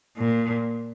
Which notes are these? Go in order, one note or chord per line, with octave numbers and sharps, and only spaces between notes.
A#2